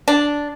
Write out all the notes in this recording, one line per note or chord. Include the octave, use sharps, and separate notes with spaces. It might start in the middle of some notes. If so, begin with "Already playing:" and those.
D4